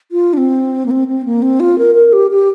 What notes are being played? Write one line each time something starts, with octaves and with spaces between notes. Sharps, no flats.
F4
D4
C4
A#3
C4
C4
A#3
C4
F4
A#4
A#4
G4
G4